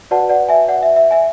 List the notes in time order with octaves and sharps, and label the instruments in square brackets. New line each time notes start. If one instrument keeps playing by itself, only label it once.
[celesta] F#4 B4 D5 F#5 A5
D5 F#5
E5 G#5
D5 F#5
E5
E5
E5 G#5